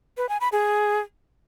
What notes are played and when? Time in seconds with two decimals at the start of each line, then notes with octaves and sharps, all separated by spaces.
0.17 B4
0.29 G#5
0.41 B5
0.52 G#4